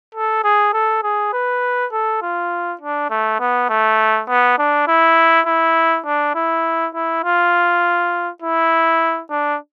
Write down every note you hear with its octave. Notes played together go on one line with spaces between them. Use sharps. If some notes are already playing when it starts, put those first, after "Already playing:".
A4
G#4
A4
G#4
B4
A4
F4
D4
A3
B3
A3
B3
D4
E4
E4
D4
E4
E4
F4
E4
D4